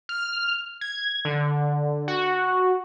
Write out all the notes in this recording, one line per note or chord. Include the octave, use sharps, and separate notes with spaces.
F6
G#6
D3
F#4